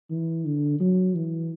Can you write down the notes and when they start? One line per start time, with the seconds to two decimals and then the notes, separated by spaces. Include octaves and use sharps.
0.10 E3
0.45 D3
0.80 F#3
1.15 E3